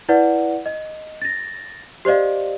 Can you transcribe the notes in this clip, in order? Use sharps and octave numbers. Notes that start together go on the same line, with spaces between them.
E4 B4 D5 F#5
D#5
A6 A#6
G4 C5 D5 D#5 F5